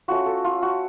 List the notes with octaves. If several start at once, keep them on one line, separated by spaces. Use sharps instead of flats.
A3 C#4 F4 F#4
A4
F4
F#4